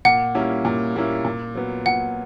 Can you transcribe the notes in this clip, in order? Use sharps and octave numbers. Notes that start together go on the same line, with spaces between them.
A#2 F#5
G3 A#3 C#4 E4
A#2
G3 A#3 C#4 E4
A#2
F#3 B3
A#2 F#5